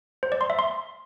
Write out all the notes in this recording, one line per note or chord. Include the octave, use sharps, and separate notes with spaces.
C5
D5
C6
E5
C6